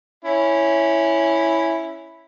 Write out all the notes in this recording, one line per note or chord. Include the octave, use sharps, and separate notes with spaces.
C#4 E4